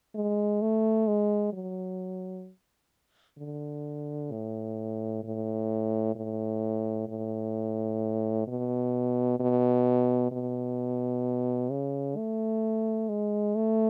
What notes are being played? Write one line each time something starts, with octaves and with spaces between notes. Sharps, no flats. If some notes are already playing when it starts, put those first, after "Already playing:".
G#3
A3
G#3
F#3
D3
A2
A2
A2
A2
B2
B2
B2
C#3
A3
G#3
A3